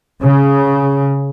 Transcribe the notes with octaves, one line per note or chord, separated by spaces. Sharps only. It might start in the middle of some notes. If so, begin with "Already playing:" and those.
C#3